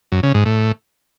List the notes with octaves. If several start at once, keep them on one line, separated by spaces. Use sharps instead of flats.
F#2
C#3
G#2
A2